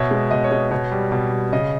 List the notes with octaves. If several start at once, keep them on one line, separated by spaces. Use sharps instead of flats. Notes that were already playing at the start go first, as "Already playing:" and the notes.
Already playing: B2 C#5 E5
G#3
B2 D#5
C#5
G#3 D#5
B2 C#5
G3
B2
G3
C#3 D#5